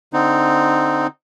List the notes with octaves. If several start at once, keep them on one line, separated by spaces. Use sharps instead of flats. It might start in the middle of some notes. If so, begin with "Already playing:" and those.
D3 C4 D#4